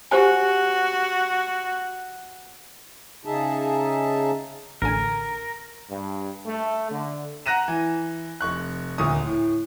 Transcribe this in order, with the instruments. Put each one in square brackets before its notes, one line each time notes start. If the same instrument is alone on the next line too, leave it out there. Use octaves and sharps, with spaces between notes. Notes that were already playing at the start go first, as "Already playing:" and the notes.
[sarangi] F#4 [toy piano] G4 C5 G#5
[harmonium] C#3 D#4 G#4 E5 A5
[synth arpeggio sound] A1 D3 G#5 [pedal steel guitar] A#4
[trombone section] G2
A3
D3
[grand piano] F#5 A#5 F#6 A#6 D#7 E7
E3
F1 C#6 F#6
D#1 D2 A#2 C#6 D#6
A2